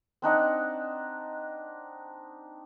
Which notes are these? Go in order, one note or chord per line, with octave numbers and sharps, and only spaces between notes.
C4 D4 D#4 F#5